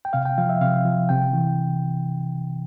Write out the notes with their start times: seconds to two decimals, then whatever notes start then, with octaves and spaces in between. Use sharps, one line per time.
0.05 G5
0.13 C3 F5
0.25 G5
0.38 F3 F5
0.49 E5
0.61 C3 F5
0.85 F3
1.09 C3 G5
1.33 E3